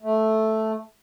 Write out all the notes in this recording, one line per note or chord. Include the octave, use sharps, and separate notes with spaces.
A3